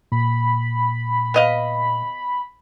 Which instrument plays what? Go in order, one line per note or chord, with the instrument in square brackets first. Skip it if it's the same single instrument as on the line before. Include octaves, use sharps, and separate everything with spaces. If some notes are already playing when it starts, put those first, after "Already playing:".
[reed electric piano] A#2 [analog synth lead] B5
[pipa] B3 D#5 F5